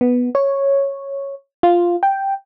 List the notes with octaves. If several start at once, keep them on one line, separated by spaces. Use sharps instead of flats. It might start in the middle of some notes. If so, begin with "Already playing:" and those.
B3
C#5
F4
G5